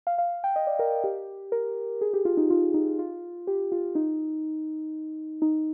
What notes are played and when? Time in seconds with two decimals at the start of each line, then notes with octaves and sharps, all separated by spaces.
0.07 F5
0.18 F5
0.44 G5
0.56 D#5
0.67 D5
0.79 A#4
1.04 G4
1.52 A#4
2.01 G#4
2.14 G4
2.25 F4
2.37 D#4
2.50 F4
2.74 D#4
2.99 F4
3.47 G4
3.72 F4
3.95 D#4
5.42 D#4